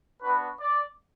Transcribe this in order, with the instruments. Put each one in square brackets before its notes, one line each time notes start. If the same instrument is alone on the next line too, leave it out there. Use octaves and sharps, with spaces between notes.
[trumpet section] B3 D4 F#4 B4
D5